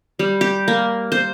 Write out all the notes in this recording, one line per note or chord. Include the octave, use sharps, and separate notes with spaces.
G3
G4
A#3
C5